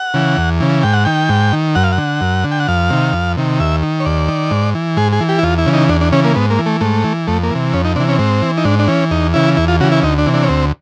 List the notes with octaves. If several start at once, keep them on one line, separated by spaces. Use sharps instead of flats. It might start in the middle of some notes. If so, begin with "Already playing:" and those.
Already playing: F#5
C#3 E3
E2
C#3 E3
G#2 G5
F#5
D#3 G5
G#2
D#3
F#2 F#5
F5
F#5
D3
F#2
D3
G5
F#5
F2 F5
C3 D#3
F2
C3 D#3
D#2 E5
D#3
C#5
D#2 D5
D#3
G#2
E3
G#2 G#4
G#4
E3
G4
E4
E2 F4
E4
C#3 E3
D#4
E2 D4
D4
C#3 E3 C#4
A#3
G#2 B3
A#3
E3
A3
G#2 A3
E3
F2 A3
A#3
C3 E3
F2 C#4
D#4
C3 E3 D4
C#4
G#2 C4
E3
D#4
G#2 D4
D4
E3 C#4
E2 D#4
C#3 E3 E4
E2 E4
F4
C#3 E3 F#4
E4
D2 D#4
D4
C3 E3
D4
C#4
D2 C4